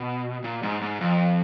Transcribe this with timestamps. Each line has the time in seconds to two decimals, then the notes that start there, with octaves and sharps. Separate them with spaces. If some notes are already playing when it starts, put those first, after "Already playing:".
Already playing: B2
0.44 A#2
0.63 G#2
0.81 G#2
1.01 F2